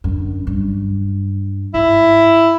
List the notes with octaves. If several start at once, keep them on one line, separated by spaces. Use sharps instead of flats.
F#2 D3
G2
G#2 E4